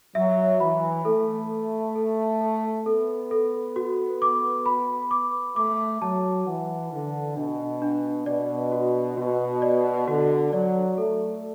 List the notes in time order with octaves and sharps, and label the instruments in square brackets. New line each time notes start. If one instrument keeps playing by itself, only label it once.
[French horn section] F#3 [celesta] E5
[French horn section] E3 [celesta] B5
[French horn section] A3 [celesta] A4
[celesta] A4
A4
A4
[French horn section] B3 [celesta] A4
[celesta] A4
F#4
D6
B5
D6
[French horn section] A3 [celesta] D6
[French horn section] F#3 [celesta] A5
[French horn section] E3 [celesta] F#5
[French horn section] D3 [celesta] B4
[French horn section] B2 [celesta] D4
[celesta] D4
[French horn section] B2 [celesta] D5
[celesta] F#4
[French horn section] B2 [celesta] F#4
[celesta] D5
[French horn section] D3 [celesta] F#4
[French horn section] F#3 [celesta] D5
[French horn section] A3 [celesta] A4